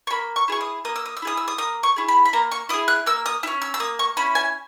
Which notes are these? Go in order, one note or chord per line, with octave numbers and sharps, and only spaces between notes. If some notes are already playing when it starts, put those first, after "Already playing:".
C#6
A#3 B5
C#6
E4 G#4 C#6
D#6
A#3 D#6
E6
D#6
E6
E4 G#4 D#6
E6
D#6
A#3 D#6
C#6
E4 G#4
B5
B5
A#3 A#5
C#6
E4 G#4 D#6
F#6
A#3 E6
D#6
E4 E6
C#4
E6
E6
A#3 D#6
C#6
C#4 E4 B5
G#5